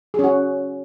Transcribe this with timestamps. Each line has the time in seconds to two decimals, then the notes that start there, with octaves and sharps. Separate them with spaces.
0.14 G#4
0.19 C#4
0.24 F#4